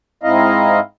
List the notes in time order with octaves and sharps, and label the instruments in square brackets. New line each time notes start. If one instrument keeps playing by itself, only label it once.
[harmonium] G#2 C4 E4 D#5 F5 A#5